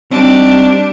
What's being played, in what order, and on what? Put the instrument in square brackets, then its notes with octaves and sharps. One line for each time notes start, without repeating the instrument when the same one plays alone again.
[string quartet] G3 D4 [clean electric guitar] C4 D#4